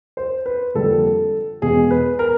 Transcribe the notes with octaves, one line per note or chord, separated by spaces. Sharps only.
C5
B4
F2 D3 G3 A#3 A4
E2 B2 G#3 B3 G#4
B4
A#4